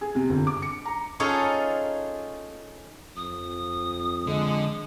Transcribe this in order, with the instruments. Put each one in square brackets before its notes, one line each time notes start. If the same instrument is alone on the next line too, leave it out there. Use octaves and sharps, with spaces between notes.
[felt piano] G#4
C3
G1
D6
C#7
A#5
[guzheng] C#4 D#4 F4 G#4 A4 C#5
[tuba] F2 [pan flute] D#6
[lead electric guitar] D3 [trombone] G#3